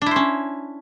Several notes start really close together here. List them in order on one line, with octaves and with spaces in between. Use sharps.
D4 E4 C5 C#4